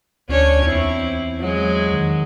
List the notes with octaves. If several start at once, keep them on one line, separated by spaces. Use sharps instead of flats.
D2 C#4 D4 C#5
E2 C4 E4
F#3 G#3
D#3